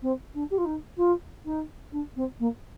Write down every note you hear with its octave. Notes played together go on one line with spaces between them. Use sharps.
C4
D4
G4
F4
D#4
F4
D#4
D4
C4
A#3